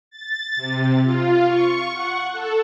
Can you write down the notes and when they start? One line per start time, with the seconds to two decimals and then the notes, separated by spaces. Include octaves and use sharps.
0.10 A6
0.56 C3
1.03 F4
1.46 C#6
1.93 F#5
2.32 A4